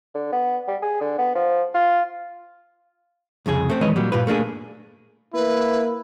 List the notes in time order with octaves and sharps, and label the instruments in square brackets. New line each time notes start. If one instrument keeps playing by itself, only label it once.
[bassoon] D3
B3
G3
G#4
D3
B3
F3
F4
[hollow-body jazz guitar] C2 F2 C#3 G#4
A3 C4
E2 D#3 G#3 B4 C#5 D#5
A#2 F#3 G3
G2 A#2 F4 G4 B4
A3 A#3 D4 G#4
[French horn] A#3 [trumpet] E4 [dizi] B4